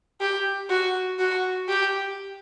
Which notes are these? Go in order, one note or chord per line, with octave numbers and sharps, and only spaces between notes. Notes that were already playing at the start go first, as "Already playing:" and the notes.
G4
F#4
F#4
G4